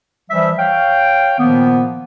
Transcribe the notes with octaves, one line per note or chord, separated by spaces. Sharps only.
E3 F3 G3 E5
C#5 F5 G5
A#2 D#3 F3 A#3 B3